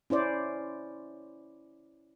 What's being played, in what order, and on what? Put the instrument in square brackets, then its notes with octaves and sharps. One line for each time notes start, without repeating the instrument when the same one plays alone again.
[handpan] C#4 E4 C5 D5